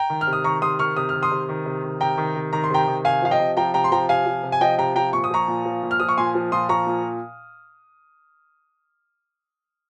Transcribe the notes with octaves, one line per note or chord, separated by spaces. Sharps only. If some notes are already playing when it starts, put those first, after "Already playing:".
Already playing: G5 A#5
D#3
F6
C3
D#6
D#3 A#5 C#6
C3 C6 D#6
D#3 C#6 F6
C3 D#6
F6
D#3
C6 D#6
C3
D#3
C3
D#3
C3 G5 A#5
D#3
C3
D#3 A#5
C6
C3 G5 A#5
D#3
C3 F5 G#5
F3 F5
D#5 G5
C3
F3 G5 A#5
C3 G5 A#5
C6
F3 G5 A#5
C3 F5 G#5
F3
C3
G#5
F3 D#5 G5
C3 G5 A#5
F3 G5 A#5
A#2 C#6
D#6
F3 A#5 C#6
A#2
F3
A#2
F6
F3 D#6
C#6
A#2 G#5 C6
F3
A#2 C6 D#6
F3 A#5 C#6
A#2